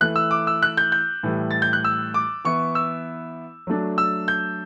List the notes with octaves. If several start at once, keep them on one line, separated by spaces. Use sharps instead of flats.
E3 A3 E4 F#6
E6
D6
E6
F#6
G6
G6
A2 E3 G3
A6
G6
F#6
E6
D6
E3 B3 E4 C#6
E6
F#3 A3 D4
E6
G6